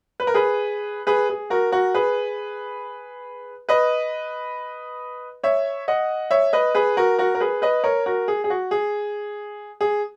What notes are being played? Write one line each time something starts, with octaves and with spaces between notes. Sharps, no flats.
B4
A#4
G#4 B4
G#4 B4
G#4
F#4 A#4
F#4 A#4
G#4 B4
B4 D#5
C#5 E5
D#5 F#5
C#5 E5
B4 D#5
G#4 B4
F#4 A#4
F#4 A#4
A#4
G#4 B4
B4 D#5
A#4 C#5
F#4 A#4
G#4
G#4
F#4
G#4
G#4